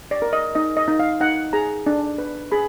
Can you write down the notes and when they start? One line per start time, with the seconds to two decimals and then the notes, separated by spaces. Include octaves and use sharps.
0.11 D5
0.22 A#4
0.33 D#5
0.55 D#4 D#5
0.77 D#5
0.88 D#4
0.99 F5
1.20 D#4 F#5
1.53 G#4 A#5
1.86 D4
2.18 B4
2.52 G#4 B5